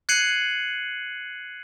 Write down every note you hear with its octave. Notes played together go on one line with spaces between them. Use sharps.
F#6 G#6 C7 C#7 D#7 F#7